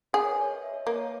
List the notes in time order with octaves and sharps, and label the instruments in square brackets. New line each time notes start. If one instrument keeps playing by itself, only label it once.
[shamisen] G#4 [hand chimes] A#4
[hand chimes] C#5
B4
C#5
D#5
E5
C#5
[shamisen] A#3 [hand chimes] B4
[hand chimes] C#5